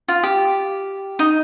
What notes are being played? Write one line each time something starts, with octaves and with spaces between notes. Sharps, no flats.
F4
G4
D#4